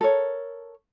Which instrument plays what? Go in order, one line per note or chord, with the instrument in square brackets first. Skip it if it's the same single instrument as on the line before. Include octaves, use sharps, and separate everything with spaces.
[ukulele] A4 A#4 C#5